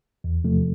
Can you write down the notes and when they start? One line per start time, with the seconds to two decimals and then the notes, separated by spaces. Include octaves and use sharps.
0.24 E2
0.44 C3 F3 A3